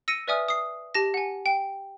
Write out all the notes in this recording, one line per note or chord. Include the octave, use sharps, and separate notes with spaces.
E6 A#6 C#7 D#7
B4 D5 E5 G#5 D#6 F6
D#6 C7
G4 A5 A#6
F#5 G#5
G5